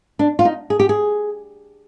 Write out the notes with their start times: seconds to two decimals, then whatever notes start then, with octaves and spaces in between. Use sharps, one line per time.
0.19 D4
0.39 F4
0.45 D#4
0.70 G#4
0.80 G4
0.89 G#4